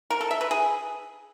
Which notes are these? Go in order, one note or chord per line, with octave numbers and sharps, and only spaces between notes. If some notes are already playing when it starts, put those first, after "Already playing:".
A#4
A4
E5
B4
G#4